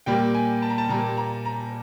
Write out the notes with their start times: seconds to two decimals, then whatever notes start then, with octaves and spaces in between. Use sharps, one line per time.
0.06 A#2 G3 A#3 G5
0.35 G#5
0.62 A5
0.70 A#5
0.78 A5
0.89 A#2 G3 A#3 A#5
1.17 A#5
1.45 A#5